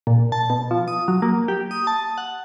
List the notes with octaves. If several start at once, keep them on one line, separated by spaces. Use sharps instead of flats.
A#2
A5
B2
F3
D#6
F#3
A#3
G4
D#6
A5
F#5